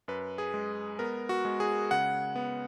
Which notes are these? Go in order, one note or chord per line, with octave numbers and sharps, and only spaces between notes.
F#2 B4
G#4
G#3
B3 A#4
F#4
G#3
G#4
C#3 F#5
B3